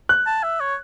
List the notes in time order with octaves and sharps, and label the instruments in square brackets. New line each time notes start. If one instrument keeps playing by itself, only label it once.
[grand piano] F#6
[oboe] A5
E5
C#5